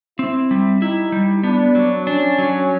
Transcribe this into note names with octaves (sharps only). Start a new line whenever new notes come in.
C4 E4
G3
D#4 E4
G3
B3 D4
F#3
C#4 D4
F#3